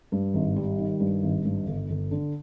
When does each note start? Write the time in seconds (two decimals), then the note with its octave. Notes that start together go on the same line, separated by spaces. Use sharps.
0.12 G2
0.34 G#1
0.56 G3
0.78 D#3
1.00 G2
1.23 G#1
1.45 G2
1.67 G1
1.89 G1
2.11 D3